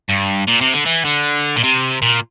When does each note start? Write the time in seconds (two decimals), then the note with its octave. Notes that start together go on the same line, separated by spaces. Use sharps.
0.09 G2
0.48 A#2
0.61 C3
0.73 D3
0.86 E3
1.05 D3
1.56 A#2
1.64 C3
2.02 A#2